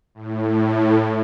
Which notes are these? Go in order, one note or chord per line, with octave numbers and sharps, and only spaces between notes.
A2